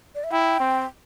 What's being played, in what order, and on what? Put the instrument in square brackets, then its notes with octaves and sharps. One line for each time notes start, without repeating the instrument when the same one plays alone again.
[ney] D5
E5
[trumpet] E4 [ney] G5
[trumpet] C4